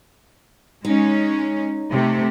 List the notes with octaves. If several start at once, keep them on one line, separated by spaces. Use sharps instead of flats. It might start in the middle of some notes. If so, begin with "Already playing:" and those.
G#3 C#4 D#4
C3 A3